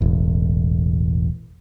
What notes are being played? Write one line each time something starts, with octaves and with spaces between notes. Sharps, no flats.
E1 A1